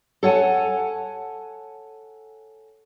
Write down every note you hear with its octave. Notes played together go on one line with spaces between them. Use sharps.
A4 C#5 F#5 G#5 A5